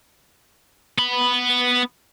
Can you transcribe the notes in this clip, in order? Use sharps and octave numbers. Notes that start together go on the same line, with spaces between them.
B3 B5